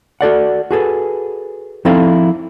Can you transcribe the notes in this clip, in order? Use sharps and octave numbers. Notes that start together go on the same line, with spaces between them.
F#4 A4 D5 F#5
F#4 G#4 A4 B4
F3 C4 D#4 E4 A4 F5